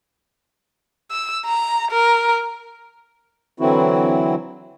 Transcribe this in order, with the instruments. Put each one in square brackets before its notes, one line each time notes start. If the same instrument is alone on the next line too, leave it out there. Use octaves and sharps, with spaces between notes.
[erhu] E6
A#5
A#4
[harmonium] D3 E3 F#3 C4 E4 F#4